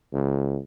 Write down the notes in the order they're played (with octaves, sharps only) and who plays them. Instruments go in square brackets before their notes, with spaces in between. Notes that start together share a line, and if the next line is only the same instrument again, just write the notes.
[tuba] C#2